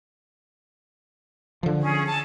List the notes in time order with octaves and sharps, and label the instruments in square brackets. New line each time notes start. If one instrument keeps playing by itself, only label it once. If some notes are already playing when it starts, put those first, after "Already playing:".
[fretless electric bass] D3 F3
[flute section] C#4 G#4
A5